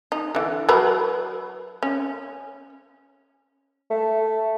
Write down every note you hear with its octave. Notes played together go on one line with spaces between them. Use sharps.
D#4
D3 E3
F#3 A#4 B4
C#4
A3